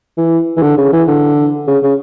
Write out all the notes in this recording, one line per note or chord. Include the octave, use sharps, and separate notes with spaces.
E3
E3
D3
C#3
E3
D3
C#3
C#3